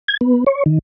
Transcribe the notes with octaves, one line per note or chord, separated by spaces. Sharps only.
G#6
B3
C#5
D#3